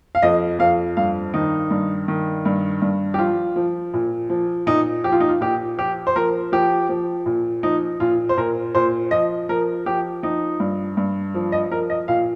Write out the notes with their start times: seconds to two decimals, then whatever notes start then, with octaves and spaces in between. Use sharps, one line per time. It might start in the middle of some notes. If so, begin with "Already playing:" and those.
0.15 F5
0.22 F2 D#5
0.59 F2 F5
0.97 G2 F5
1.34 D#3 D#4
1.71 G2
2.08 D#3
2.45 G2
2.82 G2
3.14 G4
3.18 F3 F4
3.56 F3
3.94 A#2
4.29 F3
4.67 A#2 D#4
5.04 F3 G4
5.12 F4
5.20 D#4
5.28 F4
5.41 A#2 G4
5.78 F3 G4
6.07 C5
6.16 F3 A#4
6.52 F3 G4
6.89 F3
7.26 A#2
7.63 F3 D#4
8.00 A#2 F4
8.29 C5
8.37 A#2 A#4
8.75 A#2 C5
9.11 F3 D#5
9.49 F3 A#4
9.86 F3 G4
10.23 F3 D#4
10.60 G2
10.97 G2
11.35 F3
11.52 D#5
11.71 F3 A#4
11.90 D#5
12.08 A#2 F5